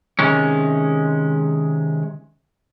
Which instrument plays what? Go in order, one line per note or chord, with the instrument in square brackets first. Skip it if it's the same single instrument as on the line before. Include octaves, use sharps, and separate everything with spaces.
[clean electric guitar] C3 D#3 G#3 C#4